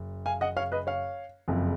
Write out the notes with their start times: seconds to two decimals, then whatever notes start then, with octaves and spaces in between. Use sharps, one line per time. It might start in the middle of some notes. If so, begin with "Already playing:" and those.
Already playing: F#1
0.26 F5 G#5
0.41 D#5 F#5
0.57 C#5 F5
0.72 B4 D#5
0.87 C#5 F5
1.48 F#1 F2 C#3 F3